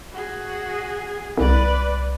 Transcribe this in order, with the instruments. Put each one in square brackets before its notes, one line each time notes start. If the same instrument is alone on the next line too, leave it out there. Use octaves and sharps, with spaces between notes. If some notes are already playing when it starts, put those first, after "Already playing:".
[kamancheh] F#4 G#4
[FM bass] C2 [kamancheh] B4 D5